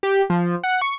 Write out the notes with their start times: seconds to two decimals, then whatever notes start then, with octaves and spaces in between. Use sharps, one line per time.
0.03 G4
0.30 F3
0.63 F#5
0.82 C#6